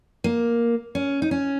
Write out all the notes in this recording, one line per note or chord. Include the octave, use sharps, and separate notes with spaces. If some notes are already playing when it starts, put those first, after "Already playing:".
A#3
C#4
D#4
C#4